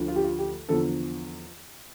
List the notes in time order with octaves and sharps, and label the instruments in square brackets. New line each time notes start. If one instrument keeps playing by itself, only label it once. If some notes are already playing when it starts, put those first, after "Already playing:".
Already playing: [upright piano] D2 D3 F3
F4
G4
F4
G4
E2 D3 F3 A4